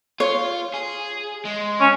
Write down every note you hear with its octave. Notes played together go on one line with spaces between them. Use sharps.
F4 C#5
G#4
G#3
C#4